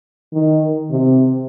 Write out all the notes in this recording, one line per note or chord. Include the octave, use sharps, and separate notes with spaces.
D#3
C3